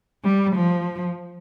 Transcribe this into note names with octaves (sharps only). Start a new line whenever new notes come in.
G3
F3